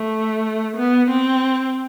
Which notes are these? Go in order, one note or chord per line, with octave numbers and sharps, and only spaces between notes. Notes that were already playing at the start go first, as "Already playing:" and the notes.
Already playing: A3
B3
C4